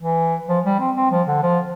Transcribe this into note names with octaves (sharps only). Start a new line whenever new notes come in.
E3
F3
G3
C4
C4
F3
D3
F3